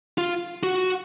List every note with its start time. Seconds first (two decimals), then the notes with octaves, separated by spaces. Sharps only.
0.18 F4
0.63 F#4